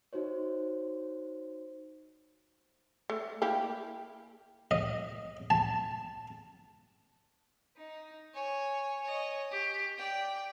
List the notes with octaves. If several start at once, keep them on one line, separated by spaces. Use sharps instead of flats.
D#4 F#4 C5 C#5
A3
A#3 E4 G4
D#5
A5
D#4
C#5 G#5
C#5 D#5
G4
D5 G5